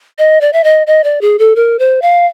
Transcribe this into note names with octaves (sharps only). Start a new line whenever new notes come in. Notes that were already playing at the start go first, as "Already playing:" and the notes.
D#5
D5
E5
D#5
D#5
D5
G#4
A4
A#4
C5
F5